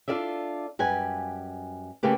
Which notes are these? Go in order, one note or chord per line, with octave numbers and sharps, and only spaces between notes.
D4 F4 A4 D5 E5
F#2 G3 B4 G#5
C#3 A3 A#3 G4 B4